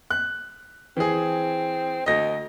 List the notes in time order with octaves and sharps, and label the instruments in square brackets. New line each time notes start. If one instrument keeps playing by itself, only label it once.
[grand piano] F#6
[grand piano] E3 G#4 [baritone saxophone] C4
[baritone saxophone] D2 [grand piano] D#5 A#6